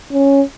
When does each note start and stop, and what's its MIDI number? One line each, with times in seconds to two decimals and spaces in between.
0.13 0.41 61